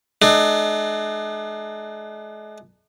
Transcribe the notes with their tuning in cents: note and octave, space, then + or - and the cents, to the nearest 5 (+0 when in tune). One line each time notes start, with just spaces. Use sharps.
G#3 +45 D4 +45